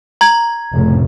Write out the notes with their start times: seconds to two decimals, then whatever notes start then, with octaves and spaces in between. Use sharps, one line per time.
0.21 A#5 G#6
0.73 F1 A2 C#3